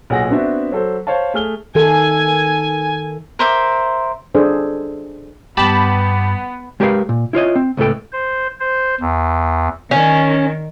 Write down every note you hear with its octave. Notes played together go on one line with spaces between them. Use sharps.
B1 A#2 G#4 F#5 G#5 A#6
B3 C4 D4 F#4 E5
F#3 A4 C5
C5 C#5 F5 A5
A3 G#4 F6 G7
D#3 A4 G#5
A#4 C5 E5 D6
D4 G#4 A4 C5
G2 B3 G4 A5 B5
G#3 G4 A#4 B4 C#5 F5
A#2
E4 F4 C#5 D#5
C4
C#2 A2 B3 A4 G5
C5
C5
E2
D#3 C#4